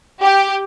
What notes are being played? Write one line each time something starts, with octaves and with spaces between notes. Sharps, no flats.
G4